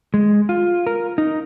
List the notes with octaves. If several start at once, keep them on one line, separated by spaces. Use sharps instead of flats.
G#3
F4
A#4
D#4